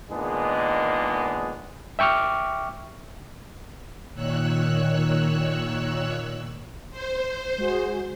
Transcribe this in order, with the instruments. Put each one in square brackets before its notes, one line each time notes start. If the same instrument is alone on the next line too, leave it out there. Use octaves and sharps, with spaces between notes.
[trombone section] A#2 D#3 G#3 B3 D4 G#4
[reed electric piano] E5 G5 C#6 D6 F6
[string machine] A#2 D#3 C#5 E6 F#6
C5
[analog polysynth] G#3 F#4 G#4